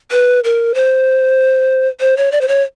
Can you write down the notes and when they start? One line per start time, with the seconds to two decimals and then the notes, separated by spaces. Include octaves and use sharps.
0.12 B4
0.44 A#4
0.75 C5
2.01 C5
2.17 C#5
2.32 D5
2.41 C5
2.48 C#5